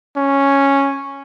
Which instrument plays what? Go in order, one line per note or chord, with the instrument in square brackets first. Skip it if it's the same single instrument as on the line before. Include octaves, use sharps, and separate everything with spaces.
[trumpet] C#4